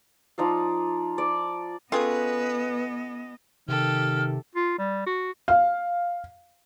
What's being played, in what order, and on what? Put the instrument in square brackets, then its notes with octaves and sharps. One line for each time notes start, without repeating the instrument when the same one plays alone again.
[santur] F3 D#4 D5 F5
D5
[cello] B3 D#5 [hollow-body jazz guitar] C#4 A4 G5 [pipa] F4 G#4 [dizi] B4
[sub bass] C3 [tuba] D#3 [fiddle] G4 A4 [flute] F6
[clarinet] F4
G3
F#4
[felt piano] F5